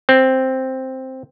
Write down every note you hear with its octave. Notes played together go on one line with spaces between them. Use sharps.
C4